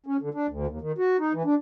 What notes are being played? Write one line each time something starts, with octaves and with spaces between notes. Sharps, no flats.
C#4
D3
D4
D2
D#2
D#3
F#4
D#4
E3
D4